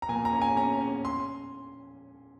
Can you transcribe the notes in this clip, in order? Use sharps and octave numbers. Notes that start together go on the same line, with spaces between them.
A#5
A#2 G#5
A#5
C#4
G#5
C#4 A#5
C#4
C6